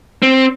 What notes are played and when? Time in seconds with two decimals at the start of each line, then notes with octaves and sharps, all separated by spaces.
0.22 C4